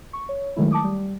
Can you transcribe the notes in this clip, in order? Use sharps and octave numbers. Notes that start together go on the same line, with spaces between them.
C#6
C#5
D#3 F#3 G#3 A3 E4
A5 D6 D#6
G3